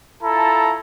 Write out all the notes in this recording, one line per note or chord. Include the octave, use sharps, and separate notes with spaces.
E4 F4 A4 A5 A#5